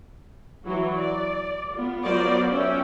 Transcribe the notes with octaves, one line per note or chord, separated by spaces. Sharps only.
E3 F#3 F#4
D5
B3 F4
F#3 B3 F4 A#4 C5 D5
C#4 E5 G5